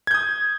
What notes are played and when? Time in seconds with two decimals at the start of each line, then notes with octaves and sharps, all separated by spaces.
0.07 G#6
0.11 G6
0.14 D#6